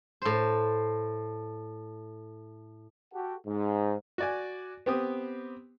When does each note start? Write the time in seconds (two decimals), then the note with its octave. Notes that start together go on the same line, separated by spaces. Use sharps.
0.22 A2 C5
3.14 F#4 G4 A4 F#5
3.47 G#2
4.18 F#4 D5 G#5
4.86 B3 C4 G4 D#6